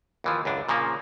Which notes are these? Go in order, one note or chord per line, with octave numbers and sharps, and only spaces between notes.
D#2 E3 F3
C#2 F#2 D4
A#2 C#3 F3 A#3